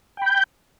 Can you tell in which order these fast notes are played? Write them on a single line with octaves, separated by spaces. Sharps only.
G5 B5 G6